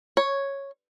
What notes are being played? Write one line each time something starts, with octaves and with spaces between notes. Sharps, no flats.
C#5